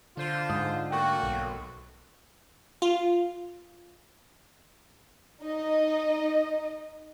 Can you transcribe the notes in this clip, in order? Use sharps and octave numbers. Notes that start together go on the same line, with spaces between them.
D3 F4 C5
G#2 D#6
A3 A#3 F#4 G5 C#6
B1
F4
D#4 D#5